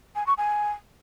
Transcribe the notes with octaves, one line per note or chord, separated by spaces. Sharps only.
G#5
C#6
G#5